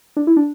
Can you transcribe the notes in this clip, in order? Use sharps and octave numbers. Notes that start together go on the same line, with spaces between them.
D4
E4
D4